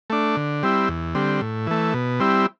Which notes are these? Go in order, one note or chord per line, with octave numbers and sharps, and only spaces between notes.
A3 D4
D3
G3 C4 E4
E2
D3 G3 C4
A2
E3 A3
B2
G3 C4 E4